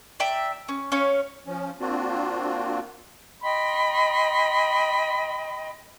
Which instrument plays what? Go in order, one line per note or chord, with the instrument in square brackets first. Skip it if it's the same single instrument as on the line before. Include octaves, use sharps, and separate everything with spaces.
[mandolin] D5 E5 G5 A#5
C#4
C#4 C#5 F5
[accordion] F3 C#4
A#3 C4 D4 F4 F#4
[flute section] D#5 G5 B5 C6